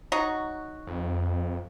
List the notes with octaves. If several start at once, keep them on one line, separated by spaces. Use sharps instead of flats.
F#3 D#4 F#4
F2